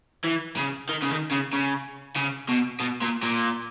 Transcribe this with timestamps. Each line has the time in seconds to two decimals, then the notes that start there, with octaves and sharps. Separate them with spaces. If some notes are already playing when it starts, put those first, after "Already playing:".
0.24 E3
0.57 C#3
0.89 D#3
1.02 C#3
1.10 D#3
1.31 C#3
1.53 C#3
2.16 C#3
2.49 B2
2.80 B2
3.02 A#2
3.22 A#2